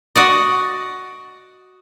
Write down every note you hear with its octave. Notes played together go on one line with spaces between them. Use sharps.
F#4 D5 D#5